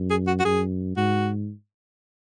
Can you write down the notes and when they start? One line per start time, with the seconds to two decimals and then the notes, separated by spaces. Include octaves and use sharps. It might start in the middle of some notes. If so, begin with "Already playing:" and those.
Already playing: F#2
0.10 G#4
0.27 F#4
0.40 F#4
0.45 F#2 G#4
0.97 G#2 F#4